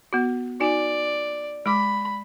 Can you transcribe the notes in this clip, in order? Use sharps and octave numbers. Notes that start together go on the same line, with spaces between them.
B3 F#4
D#4 F#4 D5 G#5
G#3 B5 D6